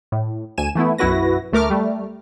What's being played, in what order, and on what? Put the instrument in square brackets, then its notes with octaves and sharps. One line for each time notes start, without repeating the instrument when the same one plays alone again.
[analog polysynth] A2
D2 G#5 D#7 E7
E3 A3 B3 E4
B1 F#2 E4 F#4 B4 A#6
D2 A3 A#4 D6 F6
G3 A3